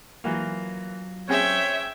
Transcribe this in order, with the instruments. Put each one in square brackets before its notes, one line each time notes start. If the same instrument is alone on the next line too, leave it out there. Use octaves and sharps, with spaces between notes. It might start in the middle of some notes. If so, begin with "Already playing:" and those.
[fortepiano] E3 A#3 [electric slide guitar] F#3 F4
[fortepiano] C4 C#4 G#4 [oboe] C#5 [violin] E5 G5